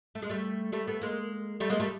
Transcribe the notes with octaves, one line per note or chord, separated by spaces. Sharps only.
A3
G#3
G3 A3
G3 A3
A3 B3
G#3 A#3
G3 A3
G#3 A#3
G3 A3